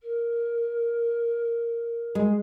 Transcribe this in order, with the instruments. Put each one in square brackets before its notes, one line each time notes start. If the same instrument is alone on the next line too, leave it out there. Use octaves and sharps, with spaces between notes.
[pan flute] A#4
[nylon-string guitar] G#3